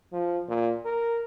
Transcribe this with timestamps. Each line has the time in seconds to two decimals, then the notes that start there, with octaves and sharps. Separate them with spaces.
0.13 F3
0.49 A#2
0.85 A#4